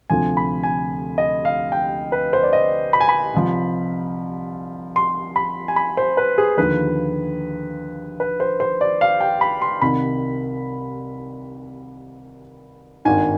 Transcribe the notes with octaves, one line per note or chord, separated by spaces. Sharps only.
D2 C3 F3 G#5
B5
G#5
D#5
F5
G5
B4
C5
D5
D#5
B5
G#5
B5
C2 C3 F3
C6
B5
G#5
B5
C5
B4
G#4
D#2 D3 F3 B4
B4
C5
C5
D5
F5
G5
B5
C6
C2 C3 D#3 B5
G#1 G2 D#3 G#5